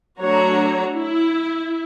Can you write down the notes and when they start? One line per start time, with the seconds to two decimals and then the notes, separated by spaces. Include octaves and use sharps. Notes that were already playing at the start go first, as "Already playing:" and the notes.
0.20 F#3 A3 D4 F#4 C#5 A#5
0.95 E4